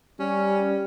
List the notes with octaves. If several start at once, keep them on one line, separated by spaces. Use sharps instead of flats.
G3 C#4